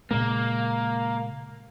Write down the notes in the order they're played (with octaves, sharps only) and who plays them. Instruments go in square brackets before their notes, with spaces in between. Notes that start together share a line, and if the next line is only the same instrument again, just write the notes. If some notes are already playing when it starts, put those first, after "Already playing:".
[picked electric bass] A#2 C#3 G#3 [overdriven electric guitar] A#3